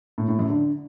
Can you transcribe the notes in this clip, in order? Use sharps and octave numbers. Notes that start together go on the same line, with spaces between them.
A2
A2
F#2
D3